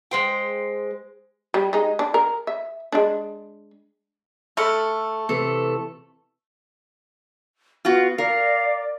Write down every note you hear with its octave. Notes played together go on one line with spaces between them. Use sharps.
G#3 C5 G5
G3
G#3 D#4
D4
A#4
E5
G#3 D4
A3 A4 B5 F6
C3 E3 A4
B3 F4 F#4
A#4 D5 F5